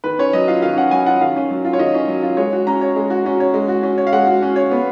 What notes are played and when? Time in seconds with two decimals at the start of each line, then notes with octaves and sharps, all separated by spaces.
0.04 D#3 B4
0.19 C#4 C#5
0.33 F#3 D#5
0.48 F4 F5
0.62 D#3 F5
0.77 C#4 F#5
0.91 F#3 G#5
1.06 F4 F#5
1.21 D#3 F5
1.36 C#4
1.50 F#3
1.65 F4
1.73 C#5
1.79 D#3 D#5
1.94 C#4
2.08 F#3
2.22 F4
2.37 G#3 C#5
2.53 F#4
2.67 C#4 A#5
2.81 C#5
2.96 G#3
3.10 F#4
3.26 C#4
3.40 C#5
3.54 G#3
3.68 F#4
3.83 C#4
3.98 C#5
4.07 F5
4.13 G#3 F#5
4.27 F#4
4.42 C#4
4.56 C#5
4.72 B3